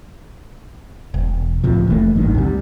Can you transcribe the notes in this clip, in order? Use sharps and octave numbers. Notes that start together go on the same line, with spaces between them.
E1
C#2 A2 C3 F3
F1 E3 A3 A#3
G#1 G2 D#3
D2 C3 G3